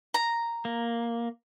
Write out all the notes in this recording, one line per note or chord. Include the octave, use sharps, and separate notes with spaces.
A#5
A#3